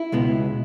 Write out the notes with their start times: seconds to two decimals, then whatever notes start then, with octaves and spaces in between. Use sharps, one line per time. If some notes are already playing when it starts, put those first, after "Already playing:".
Already playing: E4
0.12 C#2 B2 G#3 B3